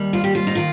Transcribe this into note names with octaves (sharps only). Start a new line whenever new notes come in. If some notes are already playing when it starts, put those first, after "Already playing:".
Already playing: D#2 D#3 G3
F4
G4
F4
D#4
D#3 F4